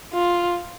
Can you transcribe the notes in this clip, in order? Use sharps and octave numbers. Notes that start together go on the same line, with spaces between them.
F4